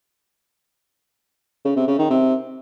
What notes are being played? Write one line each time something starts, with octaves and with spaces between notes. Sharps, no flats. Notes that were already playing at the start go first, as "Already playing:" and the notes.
C#3
C3
C#3
D#3
C3